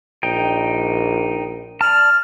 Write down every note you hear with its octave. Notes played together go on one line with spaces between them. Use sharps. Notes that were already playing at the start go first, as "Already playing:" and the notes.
A#1 D#4 G5
D5 A5 F6